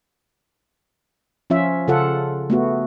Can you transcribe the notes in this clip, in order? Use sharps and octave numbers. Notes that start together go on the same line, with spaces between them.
F3 C#4 F4 E5
C#3 F4 A4 F#5
A3 B3 F#4